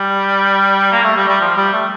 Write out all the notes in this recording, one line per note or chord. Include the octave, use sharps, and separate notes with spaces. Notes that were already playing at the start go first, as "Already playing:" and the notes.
Already playing: G3
A#3
A3
G3
G3
F3
G3
A3